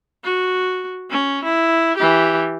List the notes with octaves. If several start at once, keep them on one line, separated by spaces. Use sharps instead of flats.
F#4
C#4
E4
E3 G4